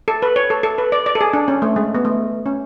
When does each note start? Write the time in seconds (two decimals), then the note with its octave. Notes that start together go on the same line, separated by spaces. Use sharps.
0.08 A4
0.22 B4
0.36 C#5
0.50 A4
0.63 A4
0.78 B4
0.92 D5
1.06 D5
1.15 A4
1.21 G#4
1.33 D4
1.48 C#4
1.62 A3
1.76 G#3
1.95 B3
2.05 A3
2.46 C#4